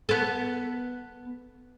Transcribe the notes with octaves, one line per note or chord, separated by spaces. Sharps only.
B3 A4